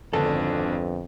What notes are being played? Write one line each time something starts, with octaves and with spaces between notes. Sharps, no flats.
G#1 F2 D3 B3 D4 A4